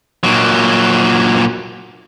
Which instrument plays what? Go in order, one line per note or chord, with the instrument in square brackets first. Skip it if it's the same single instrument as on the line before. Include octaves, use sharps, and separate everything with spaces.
[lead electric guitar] A#2 F#3